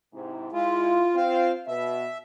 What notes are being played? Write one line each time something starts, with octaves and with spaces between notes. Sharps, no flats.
G#2 C3 E4
G#3 E4 F4
C4 F4 F5
B2 E5